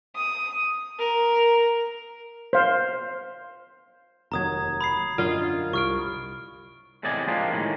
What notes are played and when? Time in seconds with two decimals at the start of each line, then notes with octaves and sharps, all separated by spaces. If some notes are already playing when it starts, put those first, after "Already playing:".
0.15 D#6
0.99 A#4
2.53 C5 F5
4.32 F1 D#2 F#3 A#5 D#6 G#6
4.81 B5 D#6 C7
5.18 F#2 D3 F4 D#5
5.73 C2 C#6 F6 D7
7.03 E2 A2 C3 D5 D#5 G#5
7.28 F3 G#3 A#3 D4 F4 G4
7.52 A2 D#3 G#3